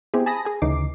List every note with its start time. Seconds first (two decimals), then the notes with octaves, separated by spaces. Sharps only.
0.14 B3 C4 E4 G4 G#4
0.26 G#5 A5 B5 D#6 A#6
0.45 G#4 G#5
0.62 D2 C#3 E3 D#4 D6 C7